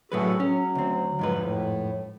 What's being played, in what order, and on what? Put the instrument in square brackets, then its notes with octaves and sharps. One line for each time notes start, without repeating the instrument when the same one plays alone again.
[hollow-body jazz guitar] A2 F#3 B4 [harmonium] F#4 G#4 A4
[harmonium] F#3 [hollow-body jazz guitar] C#4
[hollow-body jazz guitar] D2 C4
F2 G#2 B4
[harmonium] A2